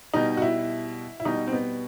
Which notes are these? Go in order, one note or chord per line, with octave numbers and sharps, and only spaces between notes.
B2 G3 D#4
F#4
E4
E4
B2 G3 D#4
C4
B3